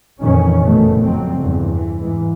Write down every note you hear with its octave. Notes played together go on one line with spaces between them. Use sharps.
F2 A#2 D#3 E3 C#4
F#1 B2 D#3 A3
F2 F#3 C4
E2 G2 C#3
E3
G#2 E3